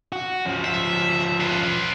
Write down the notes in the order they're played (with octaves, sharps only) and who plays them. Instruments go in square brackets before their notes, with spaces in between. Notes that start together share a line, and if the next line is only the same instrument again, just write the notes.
[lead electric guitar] F#4
F3 C#4
[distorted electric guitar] E5
F4 B4